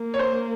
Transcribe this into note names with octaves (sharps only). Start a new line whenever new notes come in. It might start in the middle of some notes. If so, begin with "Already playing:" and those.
Already playing: A#3
C#5
C5